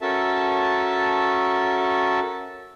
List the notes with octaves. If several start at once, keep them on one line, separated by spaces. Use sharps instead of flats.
C#4 F#4 A4 A#4 E5 A5